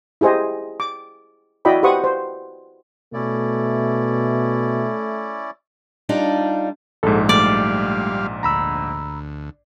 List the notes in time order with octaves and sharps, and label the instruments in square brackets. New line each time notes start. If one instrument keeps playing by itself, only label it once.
[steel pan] E4 G4 G#4 C5 D#5
D6
E4 F#4 D5 D#5 G5 B5
G4 B4 C5 F#5 C#6 D#6
C5
[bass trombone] B2 [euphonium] A3 [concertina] C#4 E4 D5
[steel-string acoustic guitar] G3 D4 D#4 F4
[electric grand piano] A#1 G#2 [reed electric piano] A4
[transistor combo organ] G3 F5 [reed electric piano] A3 [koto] D5
[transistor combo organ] D2 [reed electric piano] A#5 B5 E6